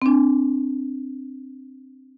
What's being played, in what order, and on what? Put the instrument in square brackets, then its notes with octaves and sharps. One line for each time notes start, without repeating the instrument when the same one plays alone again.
[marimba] C4 D4